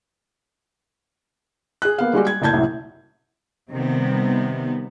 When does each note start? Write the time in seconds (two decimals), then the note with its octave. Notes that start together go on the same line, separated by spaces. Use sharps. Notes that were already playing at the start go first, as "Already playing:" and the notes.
1.82 G#4 F#6
1.98 A#3 B3 F5
2.13 G3 G#3 F#4 G4
2.27 G#6
2.42 F#1 A2 A5 G6 G#6
2.53 C2 F#2 A2
3.71 C3 D#3 G3 B3